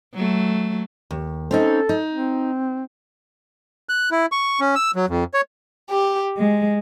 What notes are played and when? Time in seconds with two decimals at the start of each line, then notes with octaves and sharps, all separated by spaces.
0.14 F#3 A3
1.11 D#2
1.51 C4 C#4 D#4 A4
1.89 D#4
2.13 C4
3.89 F#6
4.11 E4
4.32 C#6
4.60 C#4
4.75 E6
4.96 F#3
5.09 F2
5.34 C#5
5.89 G4
6.38 G#3